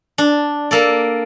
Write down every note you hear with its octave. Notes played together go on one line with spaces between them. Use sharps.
D4
A#3 A4 D5